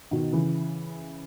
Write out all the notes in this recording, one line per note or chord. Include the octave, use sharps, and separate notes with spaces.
B2 D#3
C#3 E3